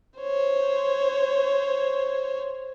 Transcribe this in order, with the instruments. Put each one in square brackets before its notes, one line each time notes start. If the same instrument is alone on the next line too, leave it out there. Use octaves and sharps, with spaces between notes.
[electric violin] C5 C#5